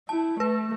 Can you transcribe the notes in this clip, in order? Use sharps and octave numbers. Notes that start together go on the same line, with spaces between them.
E4 A5
A3 B4